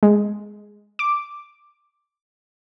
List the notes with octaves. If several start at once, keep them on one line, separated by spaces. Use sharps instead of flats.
G#3
D6